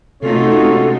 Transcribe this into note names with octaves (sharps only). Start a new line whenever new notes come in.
C3 A3 C#4 D#4 F4 F#4 A4 C#5